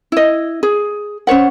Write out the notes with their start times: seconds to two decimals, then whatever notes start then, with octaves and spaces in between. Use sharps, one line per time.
0.12 E4 D#5
0.63 G#4
1.27 C#4 C5 C#5 F#5